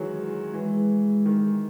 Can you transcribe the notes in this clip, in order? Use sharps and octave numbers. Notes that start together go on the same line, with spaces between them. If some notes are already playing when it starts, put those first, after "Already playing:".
Already playing: D#3 E3 F#3 G#3
E3 G#3
D#3